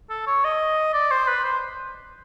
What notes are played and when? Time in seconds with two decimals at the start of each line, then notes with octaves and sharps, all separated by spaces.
0.10 A4
0.27 C#5
0.44 D#5
0.93 D5
1.11 C5
1.28 B4
1.44 C5